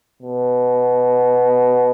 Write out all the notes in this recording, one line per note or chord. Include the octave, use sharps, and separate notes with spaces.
B2